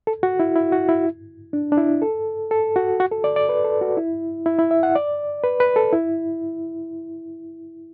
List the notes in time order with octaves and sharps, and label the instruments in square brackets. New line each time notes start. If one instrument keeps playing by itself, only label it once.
[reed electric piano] A4
F#4
E4
E4
F#4
E4
D4
D4
E4
A4
A4
F#4
F#4
A4
D5
D5
B4
A4
F#4
E4
E4
E4
E5
F#5
D5
B4
B4
A4
E4